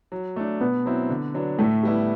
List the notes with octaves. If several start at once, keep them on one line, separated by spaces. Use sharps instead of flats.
F#3
A3 D4
B2 B3
F#3 C4 E4
D3
F#3 B3 D4
A2 A3
G3 B3 E4